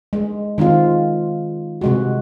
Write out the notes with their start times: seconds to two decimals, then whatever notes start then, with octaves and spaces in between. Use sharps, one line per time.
0.13 G#3
0.58 D#3 G#3 C4 F4
1.81 C3 G#3 F#4